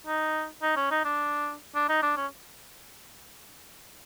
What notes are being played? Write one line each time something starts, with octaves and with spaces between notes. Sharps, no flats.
D#4
D#4
C#4
D#4
D4
D4
D#4
D4
C#4